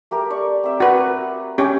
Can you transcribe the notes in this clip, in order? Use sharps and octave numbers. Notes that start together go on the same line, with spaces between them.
A3 G4 A#4
D5 C#6
C4 E5 G5
F#4 B4
C#4 G4